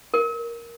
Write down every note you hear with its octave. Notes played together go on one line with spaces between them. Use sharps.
A#4